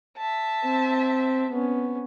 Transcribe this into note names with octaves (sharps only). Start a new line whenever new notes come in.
E5 A5
C4
B3 C#4